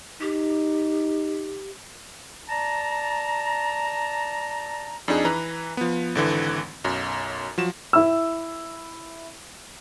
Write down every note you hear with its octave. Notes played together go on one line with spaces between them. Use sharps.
D#4 G4
D5 A5 A#5
F2 D4 D#4 G#4
E3 B4 A#5
F3 B3
G#1 D3 E3
B1 F#2
F3 F#3 E7
E4 E6